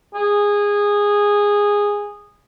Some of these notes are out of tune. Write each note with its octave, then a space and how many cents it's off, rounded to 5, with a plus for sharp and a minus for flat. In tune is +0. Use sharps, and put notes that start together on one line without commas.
G#4 -15